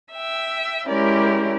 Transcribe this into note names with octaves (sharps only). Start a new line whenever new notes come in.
E5 G5
G#3 C#4 E4 G4 A#4 D5